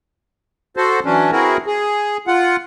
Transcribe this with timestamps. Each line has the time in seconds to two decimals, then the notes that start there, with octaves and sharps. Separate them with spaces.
0.77 F#4 A4 C5
1.05 E3 F#3 C#4 D4
1.32 C4 E4 F#4 G#4 A#4
1.67 G#4
2.27 F4 F#5